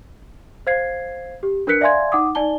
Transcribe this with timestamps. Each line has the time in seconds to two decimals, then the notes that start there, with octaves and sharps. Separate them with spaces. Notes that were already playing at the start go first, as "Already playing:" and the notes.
0.67 C5 F5 G#6 C7
1.43 G4
1.67 D4 A#4 B4 F#6 B6 C#7
1.81 D5 E5 F5 G#5 C6 G#6
2.12 D#4 F#5 D6 D#6
2.35 D#4 D5 G#5 A5 G7